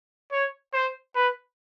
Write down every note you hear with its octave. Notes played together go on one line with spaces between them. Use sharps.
C#5
C5
B4